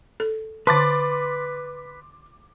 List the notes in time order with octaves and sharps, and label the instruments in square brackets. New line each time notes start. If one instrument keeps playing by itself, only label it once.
[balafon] A4
[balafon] D3 A5 [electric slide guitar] B4 [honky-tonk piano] C6 D6 A6